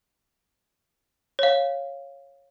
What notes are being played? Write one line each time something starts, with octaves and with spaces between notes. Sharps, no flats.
C#5 F5